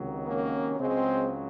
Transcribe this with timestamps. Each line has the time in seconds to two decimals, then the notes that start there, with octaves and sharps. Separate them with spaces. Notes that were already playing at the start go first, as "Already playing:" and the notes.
Already playing: C#2 C3 D#3 F#3
0.26 A#3 C#4
0.78 C#2 C#3 F#3 G#3 C4